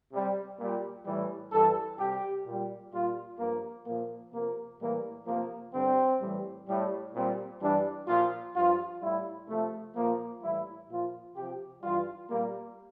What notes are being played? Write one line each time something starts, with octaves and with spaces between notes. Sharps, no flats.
C3 G3
A#2 G3
A2 E3 G3
G2 E3 G3 A4
C3 G3 G4
A#2
G3
A#2 G3 F4
G2 F3 A#3
A#2 F3 A#3
C3 F3 A#3
A2 E3 G3 A#3
C3 F3 A#3
G2 D3 G3 C4
A2 E3 G3
A2 G3
A#2 G3 C4
G2 E3 G3 D4
A#2 F3 F4
G2 F3 F4
A2 G3 E4
C3 F3 A3
A#2 F3 A#3
A2 E3 G3 E4
A#2 F3 F4
C3 F3 G4
G2 E3 G3 F4
A#2 G3 A#3